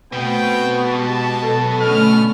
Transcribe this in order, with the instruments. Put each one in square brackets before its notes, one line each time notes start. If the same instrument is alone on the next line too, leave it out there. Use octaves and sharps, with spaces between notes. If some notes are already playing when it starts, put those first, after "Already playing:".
[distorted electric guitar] B2 [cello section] A3 C4 [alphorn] B3 [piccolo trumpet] G5
[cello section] G#3 G4 [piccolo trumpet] A5
[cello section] F#3 [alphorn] A4
[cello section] D3 A3 C#4 [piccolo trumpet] F6